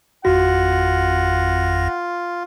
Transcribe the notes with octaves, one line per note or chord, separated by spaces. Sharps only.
G#1 F2 F4 F#4 F#5 A#6